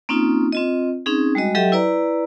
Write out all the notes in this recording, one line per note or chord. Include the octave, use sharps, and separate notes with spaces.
A#3 C4 C#4 D#4 F4
C4 F4 D#5
C4 C#4 D#4 G#4
G3 G#3 F#4 D#5
F#3 G4 A4 D#5 E5 G5
E4 B4 D5 A#5